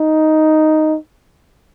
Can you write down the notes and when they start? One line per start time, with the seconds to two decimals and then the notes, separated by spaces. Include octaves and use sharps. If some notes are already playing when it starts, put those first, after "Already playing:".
Already playing: D#4